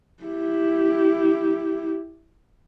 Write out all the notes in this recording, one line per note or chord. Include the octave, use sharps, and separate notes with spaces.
E4 G4